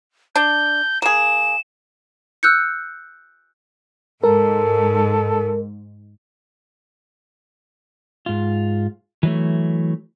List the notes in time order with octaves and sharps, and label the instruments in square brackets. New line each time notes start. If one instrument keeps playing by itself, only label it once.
[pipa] D4 [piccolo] G6
[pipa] A#3 G#4 [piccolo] E7
[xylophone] E6 F#6 G6 C#7
[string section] G#2 [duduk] A4 [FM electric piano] A#4
[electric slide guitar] G#2 F4
E3 F#3 A3